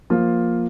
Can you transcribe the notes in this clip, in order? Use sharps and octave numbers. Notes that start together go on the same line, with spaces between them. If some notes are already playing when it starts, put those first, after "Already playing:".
F3 A#3 F4